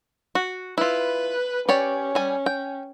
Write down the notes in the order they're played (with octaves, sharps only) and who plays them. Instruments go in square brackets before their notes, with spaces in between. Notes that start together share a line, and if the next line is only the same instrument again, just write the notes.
[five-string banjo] F#4
[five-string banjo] E4 F4 [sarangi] B4
[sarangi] C#4 [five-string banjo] G4 C#5 D5
[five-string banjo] G3 G#5
G5